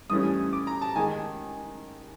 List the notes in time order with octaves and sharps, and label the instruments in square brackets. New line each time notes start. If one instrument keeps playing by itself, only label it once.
[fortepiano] G2 E3 A3 C#4 [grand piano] D#6
[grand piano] D6
A#5
A5
[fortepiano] D#3 G#3 [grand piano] G#5